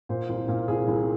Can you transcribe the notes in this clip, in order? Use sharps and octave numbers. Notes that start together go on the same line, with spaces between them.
A#2 C5
C2 C5
A#2 A#4
C2 G#4
C2